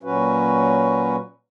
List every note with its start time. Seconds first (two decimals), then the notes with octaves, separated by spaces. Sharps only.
0.03 A#2 F#3 C#4 F#4 B4